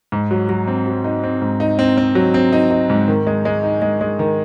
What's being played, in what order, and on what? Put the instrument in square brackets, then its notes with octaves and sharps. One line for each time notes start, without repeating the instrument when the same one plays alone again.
[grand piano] G#2
F#3
F#3
C4
F#3
D#4
C4
G#2
D#4
C4
C4
F#3
C4
D#4
D#4
G#2
D#3
G#3
G#3
D#4
G#3
G#3
D#3